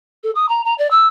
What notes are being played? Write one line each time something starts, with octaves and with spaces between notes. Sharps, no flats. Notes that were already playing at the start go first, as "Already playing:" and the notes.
A4
D#6
A#5
A#5
D5
E6